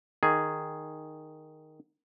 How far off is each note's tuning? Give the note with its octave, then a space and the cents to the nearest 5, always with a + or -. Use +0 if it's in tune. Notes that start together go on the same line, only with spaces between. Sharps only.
D#3 +0 G#4 +0